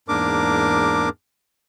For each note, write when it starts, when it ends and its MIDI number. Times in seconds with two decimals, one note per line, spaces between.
0.08 1.09 40
0.08 1.09 44
0.08 1.09 58
0.08 1.09 62
0.08 1.09 70
0.08 1.09 86